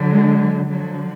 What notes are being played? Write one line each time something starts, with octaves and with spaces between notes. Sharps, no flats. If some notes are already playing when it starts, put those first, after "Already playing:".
Already playing: D3 F#3
G#3
F#3
D3 F3 F#3